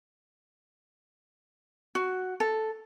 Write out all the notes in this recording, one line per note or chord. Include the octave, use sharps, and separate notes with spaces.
F#4
A4